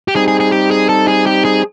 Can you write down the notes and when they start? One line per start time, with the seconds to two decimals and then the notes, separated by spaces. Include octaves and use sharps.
0.08 G4
0.15 G3 C4 D#4 G#4
0.28 G#4
0.40 G#4
0.52 G4
0.71 G#4
0.89 A4
1.08 G#4
1.27 G4
1.45 G#4